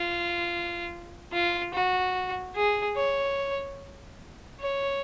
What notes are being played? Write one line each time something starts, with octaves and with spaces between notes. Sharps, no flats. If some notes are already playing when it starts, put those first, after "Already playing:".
Already playing: F4
F4
F#4
G#4
C#5
C#5